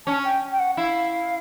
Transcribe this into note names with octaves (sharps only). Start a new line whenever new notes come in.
C#4 A5
G5
G5
F#5
E4 F5